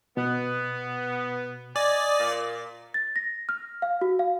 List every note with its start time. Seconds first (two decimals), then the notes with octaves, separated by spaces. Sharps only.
0.17 B2 B3
1.76 D5 D#5 G#5
2.19 A#2
2.94 A6
3.16 A#6
3.49 F6
3.82 F5
4.01 F#4
4.19 F5